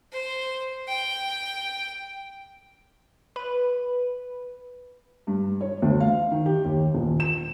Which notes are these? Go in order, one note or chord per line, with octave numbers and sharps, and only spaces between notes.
C5
G5
B4
G2
C#5
D2
F5
D#3
G4
D#2
D#1
E7